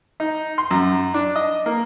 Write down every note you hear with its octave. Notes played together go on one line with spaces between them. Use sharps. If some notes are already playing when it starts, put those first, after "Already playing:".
D#4
C6
F#2
D4
D#5
A#3